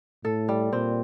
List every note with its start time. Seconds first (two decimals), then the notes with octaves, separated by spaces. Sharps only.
0.25 A2 A4
0.49 G3
0.73 A#2 C4